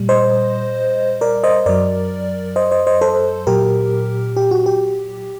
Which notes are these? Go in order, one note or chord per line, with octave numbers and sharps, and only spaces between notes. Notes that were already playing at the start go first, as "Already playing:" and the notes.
Already playing: A#2 G3
C5 D#5
A#4 D5
C5 D#5
F#2 F#3 A#4 D5
C5 D#5
C5 D#5
C5 D#5
A4 C5
A#2 F#3 G4 A#4
G4
F#4
G4